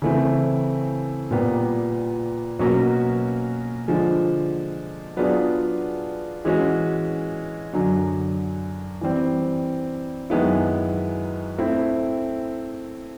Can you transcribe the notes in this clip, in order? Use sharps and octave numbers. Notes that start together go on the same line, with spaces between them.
C#3 E3 A3 C4 E4
A#2 G3 B3
B2 F#3 A#3 C#4 F#4
D3 F3 G#3
F#3 B3 D4 F4 G#4
E3 G#3 C#4 F#4
F#2 D3 F#3
E3 G3 C4
F#2 D#3 G#3 B3 E4
A3 C4 E4